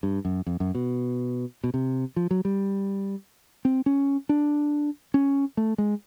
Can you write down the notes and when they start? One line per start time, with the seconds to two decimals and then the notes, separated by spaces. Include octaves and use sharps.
0.03 G2
0.25 F#2
0.46 F2
0.60 F#2
0.75 B2
1.64 B2
1.74 C3
2.16 F3
2.31 F#3
2.45 G3
3.65 C4
3.86 C#4
4.29 D4
5.14 C#4
5.57 A3
5.78 G#3